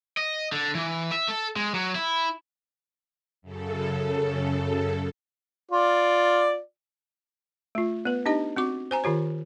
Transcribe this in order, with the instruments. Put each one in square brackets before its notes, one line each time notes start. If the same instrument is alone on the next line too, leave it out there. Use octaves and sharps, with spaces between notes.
[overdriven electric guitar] D#5
D3
E3
E5
A4
G#3
F#3
E4
[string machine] F#2 C#3 A4
[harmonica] F4 D5
[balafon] A3 F4
B3 B4
D4 D#4 G4 D#5
C4 F#4 D6
C5 G#5 A#5
D#3 F4 G4 C#5